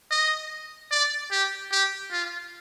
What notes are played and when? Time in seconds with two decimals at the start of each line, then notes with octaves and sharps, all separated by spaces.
0.11 D#5
0.91 D5
1.31 G4
1.71 G4
2.11 F4